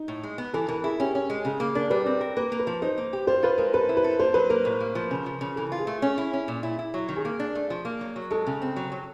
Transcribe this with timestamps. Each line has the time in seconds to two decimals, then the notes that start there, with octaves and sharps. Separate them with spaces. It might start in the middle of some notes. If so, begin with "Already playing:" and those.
Already playing: D#4
0.08 A2
0.23 G#3
0.38 B3
0.54 E3 A4
0.68 E3 A#4
0.83 E4 G#4
1.00 C#4 G4
1.15 C#4
1.30 G#3
1.45 C#3 G#4
1.60 A#3 G#4
1.75 D4 A#4
1.90 G3 B4
2.06 C4
2.21 A#4
2.37 A#3 B4
2.52 A#3
2.59 B4
2.67 F3
2.82 D#4 C5
2.98 A#3
3.13 G4
3.27 F4 C5
3.43 F4 B4
3.58 G#3 A#4
3.73 A4 B4
3.89 E4
3.97 B4
4.04 A4
4.19 A#3 C5
4.34 F#3 B4
4.50 A#3 A#4
4.65 A2
4.80 A#3
4.95 F3
5.11 C#3
5.26 F3
5.41 C#3
5.56 E3 A4
5.72 F4
5.79 G#4
5.87 A3
6.02 C#4
6.18 E4
6.33 C#4
6.48 A#2
6.63 E4
6.79 E4
6.94 F#3
7.09 D#3
7.16 G#4
7.25 A#3
7.40 D4
7.55 A3
7.70 F3
7.85 A#3
8.01 F#3
8.16 F#3
8.31 G#3 A4
8.47 C#3
8.62 C4
8.76 F#3
8.92 F#3